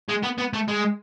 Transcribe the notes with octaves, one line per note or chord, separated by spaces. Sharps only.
G#3
B3
B3
A3
G#3